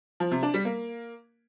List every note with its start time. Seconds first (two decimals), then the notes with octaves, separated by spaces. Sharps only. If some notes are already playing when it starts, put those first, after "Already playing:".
0.20 F3
0.31 C3
0.43 D4
0.54 G3
0.65 A#3